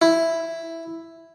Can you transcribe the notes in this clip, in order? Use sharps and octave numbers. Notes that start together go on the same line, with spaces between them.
E4